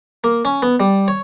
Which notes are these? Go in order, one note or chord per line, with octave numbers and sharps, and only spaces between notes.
A#3
C#4
B3
G3
C#5